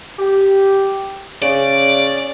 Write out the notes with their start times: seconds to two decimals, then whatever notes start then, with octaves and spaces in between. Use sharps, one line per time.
0.19 G4
1.42 C#3 D5